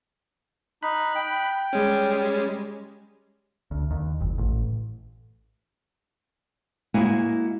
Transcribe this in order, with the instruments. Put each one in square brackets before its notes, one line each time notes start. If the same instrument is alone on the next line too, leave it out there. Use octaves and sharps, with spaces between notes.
[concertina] D#4 [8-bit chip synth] B5 F#6
[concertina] G5
[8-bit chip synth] G3 G#3 C#4
[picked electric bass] D2
D#2
F#1
A1
[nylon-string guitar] G#3 A#3 E4 F#4 G#5